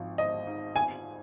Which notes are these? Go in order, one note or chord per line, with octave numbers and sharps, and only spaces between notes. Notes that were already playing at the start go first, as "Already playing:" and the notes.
Already playing: G#1 F3
C4 D#5
G#2
G#5